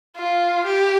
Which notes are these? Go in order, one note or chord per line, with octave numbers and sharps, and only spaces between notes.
F4
G4